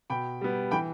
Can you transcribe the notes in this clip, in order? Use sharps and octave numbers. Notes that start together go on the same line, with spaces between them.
B2 G5 B5
G3 B3
E3 G5 B5